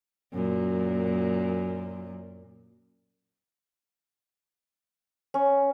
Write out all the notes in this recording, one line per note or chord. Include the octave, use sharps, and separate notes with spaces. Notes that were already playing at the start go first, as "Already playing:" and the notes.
F#2 A#2
C#4